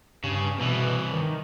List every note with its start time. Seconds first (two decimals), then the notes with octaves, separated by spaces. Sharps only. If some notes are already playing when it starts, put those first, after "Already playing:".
0.24 G2 C#3
0.58 C2 B2 E3
1.12 D#3